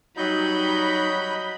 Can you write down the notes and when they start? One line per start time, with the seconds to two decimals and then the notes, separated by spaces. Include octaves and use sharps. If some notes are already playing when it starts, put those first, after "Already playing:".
0.17 F#3 G3 D#4 D#5 B5 G6